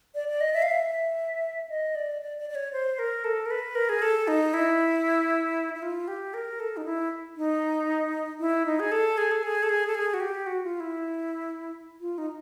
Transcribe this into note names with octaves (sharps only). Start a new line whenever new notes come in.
D5
D5
D#5
E5
F5
E5
D#5
D5
D5
D5
D5
C#5
C5
A#4
A4
A#4
B4
A#4
G#4
A4
D#4
E4
E4
F4
G4
A#4
A4
D#4
E4
D#4
E4
D#4
G#4
A4
G#4
A4
G#4
A4
G#4
A4
G#4
F#4
G4
F#4
F4
E4
F4
D#4